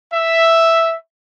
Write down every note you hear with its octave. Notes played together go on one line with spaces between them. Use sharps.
E5